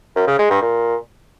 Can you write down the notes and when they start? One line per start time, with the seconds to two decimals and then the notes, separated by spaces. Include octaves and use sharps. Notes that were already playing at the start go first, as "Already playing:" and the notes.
0.16 F#2
0.27 C#3
0.39 G#3
0.50 G2
0.62 A#2